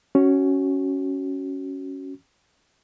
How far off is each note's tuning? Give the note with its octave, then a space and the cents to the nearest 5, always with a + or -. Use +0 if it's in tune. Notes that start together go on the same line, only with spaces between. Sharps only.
C#4 +0 F#4 +15